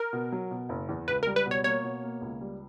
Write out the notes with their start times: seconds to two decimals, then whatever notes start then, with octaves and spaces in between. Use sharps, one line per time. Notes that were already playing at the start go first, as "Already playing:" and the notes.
Already playing: A#4
0.13 B2
0.32 F#3
0.51 B2
0.69 F#1
0.89 E2
1.08 C#2 B4
1.23 G3 A#4
1.36 B4
1.46 B2
1.51 C#5
1.64 A#3 C#5
1.84 B2
2.03 A#3
2.21 C#2
2.41 G3